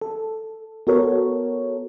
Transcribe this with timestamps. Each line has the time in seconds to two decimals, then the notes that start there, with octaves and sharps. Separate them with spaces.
0.01 A4
0.87 B3 F#4 A4 A#4 C#5